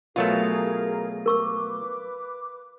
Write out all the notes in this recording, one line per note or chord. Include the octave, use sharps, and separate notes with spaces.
B2 F#3 A3 F4 G#4 A#4
A#4 B4 C#6 D6 E6